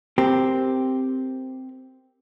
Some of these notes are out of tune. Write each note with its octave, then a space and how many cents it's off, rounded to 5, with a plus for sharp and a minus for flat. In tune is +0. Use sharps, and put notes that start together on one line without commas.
C4 -5 G4 +0 A#4 +0